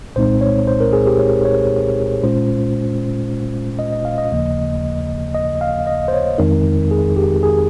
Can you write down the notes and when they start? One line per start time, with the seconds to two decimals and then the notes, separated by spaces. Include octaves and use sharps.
0.16 C2 A#2 G#3 C4 D#4 C5
0.41 C#5
0.67 C5
0.80 A#4
0.93 G#4
1.06 G4
1.19 C#5
1.45 C#5
2.24 A#2 G#3 C#4 F4 C5
3.79 D#5
3.92 D#5
4.05 F5
4.18 D#5
4.31 D#2 C#3 F3 A#3
5.35 D#5
5.61 F5
5.87 D#5
6.08 C5
6.13 C#5
6.38 F2 D#3 G#3 C4 D#4 A#4
6.91 G#4
7.16 G4
7.43 G#4